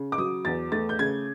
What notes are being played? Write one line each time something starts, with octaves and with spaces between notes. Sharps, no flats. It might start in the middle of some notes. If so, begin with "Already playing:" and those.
Already playing: C#3
D6
F#3 D#6
E2 A6
A3 A6
G6
C#3 G#6